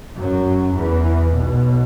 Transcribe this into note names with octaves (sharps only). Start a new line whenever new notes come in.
F#2 F#3
E2 E3
B1 B2